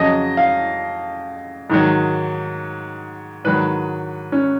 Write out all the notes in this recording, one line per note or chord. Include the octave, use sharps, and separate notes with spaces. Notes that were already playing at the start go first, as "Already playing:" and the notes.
Already playing: F2 C#3 F#3 D#5
F5
G#2 D#3 F#3
G#2 D#3 F#3 B4
C#4